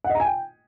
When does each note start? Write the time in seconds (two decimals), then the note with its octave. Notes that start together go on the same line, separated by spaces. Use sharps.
0.04 F#5
0.10 D#5
0.15 A#5
0.20 G#5
0.25 G5